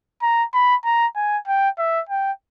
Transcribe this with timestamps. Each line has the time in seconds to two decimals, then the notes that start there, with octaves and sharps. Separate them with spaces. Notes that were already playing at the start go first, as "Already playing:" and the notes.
0.22 A#5
0.54 B5
0.85 A#5
1.16 G#5
1.48 G5
1.79 E5
2.10 G5